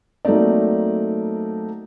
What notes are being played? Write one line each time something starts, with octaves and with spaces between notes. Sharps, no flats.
F#3 A3 A#3 C4 D#4 D5